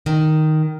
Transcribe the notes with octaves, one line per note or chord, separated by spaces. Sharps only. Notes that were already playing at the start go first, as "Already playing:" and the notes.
D#3